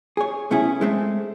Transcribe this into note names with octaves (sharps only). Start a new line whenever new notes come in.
G#4 C#5
B2 A3 C#4 E4 G#4
G#3 A3 C4